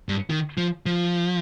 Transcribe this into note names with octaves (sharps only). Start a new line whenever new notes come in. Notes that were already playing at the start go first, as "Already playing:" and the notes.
G2
D#3
F3
F3